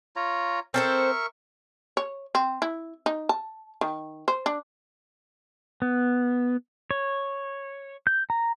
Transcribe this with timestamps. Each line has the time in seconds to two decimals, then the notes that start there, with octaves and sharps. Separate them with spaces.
0.16 F4 C#5 A#5
0.74 C4 A4 A#4 C5 E5 C#6
1.97 C#5
2.35 C4
2.62 E4
3.06 D#4
3.29 A5
3.81 D#3
4.28 C5
4.46 D4
5.82 B3
6.91 C#5
8.07 G6
8.30 A#5